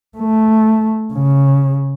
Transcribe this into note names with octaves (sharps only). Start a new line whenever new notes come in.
A3
C#3